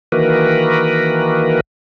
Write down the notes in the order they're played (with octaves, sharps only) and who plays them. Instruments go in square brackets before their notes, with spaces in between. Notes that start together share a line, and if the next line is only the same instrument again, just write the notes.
[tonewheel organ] D#3 E3 A#3 F#4 A#4 B4